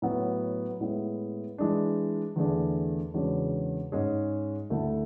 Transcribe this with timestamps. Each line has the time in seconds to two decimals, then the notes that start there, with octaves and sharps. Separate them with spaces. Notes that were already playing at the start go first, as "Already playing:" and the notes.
0.02 A2 F#3 B3
0.81 A2 G#3 B3 E4
1.58 E3 G#3 D4
2.36 E2 D3 A3 D4 G#4
3.14 E2 C#3 G#3 D4 F#4
3.92 G#2 G#3 C#4 G#4
4.70 D2 D3 A3 E4 A4